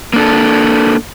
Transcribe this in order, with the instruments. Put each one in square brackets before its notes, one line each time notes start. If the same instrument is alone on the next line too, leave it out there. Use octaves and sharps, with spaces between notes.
[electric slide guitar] A#3 D4 A4